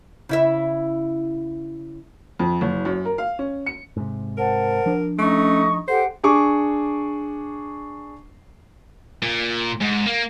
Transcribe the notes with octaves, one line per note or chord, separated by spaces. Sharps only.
C#3 E4 E5
F2
F#1
F#2
A#4
F5
C#4
C#7
G#2 C3
A#4 C5 F#5 A5
F3 D4
A3 C#4 D#4 D#5 C#6
G4 A4 C5 F#5
D4 G#4 C#6 D6
A#2
G#2
A#3